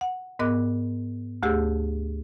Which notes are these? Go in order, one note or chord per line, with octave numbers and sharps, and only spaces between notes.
F#5
G#2 B3 A#4 D#5 D6 F#6
D2 A3 G4 G#4 E6